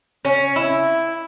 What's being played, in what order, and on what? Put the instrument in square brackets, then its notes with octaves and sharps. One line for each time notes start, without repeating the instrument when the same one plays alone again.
[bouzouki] C#4
E4